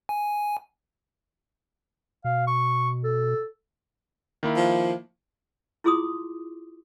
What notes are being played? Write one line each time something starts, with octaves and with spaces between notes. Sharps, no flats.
G#5
B2 F5
C#6
A4
D#3 A#3 E4
F3
E4 F4 G#4 C6 D6 D#6